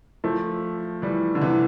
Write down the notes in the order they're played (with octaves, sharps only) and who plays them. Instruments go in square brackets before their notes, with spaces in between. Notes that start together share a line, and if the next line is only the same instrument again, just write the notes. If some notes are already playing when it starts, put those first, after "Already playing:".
[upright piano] F3 A3
E3 G3
D3
C3 E3